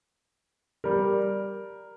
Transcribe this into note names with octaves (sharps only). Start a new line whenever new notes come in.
G3 A#4